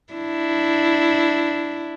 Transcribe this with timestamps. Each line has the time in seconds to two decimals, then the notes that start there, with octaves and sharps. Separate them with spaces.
0.14 D4 E4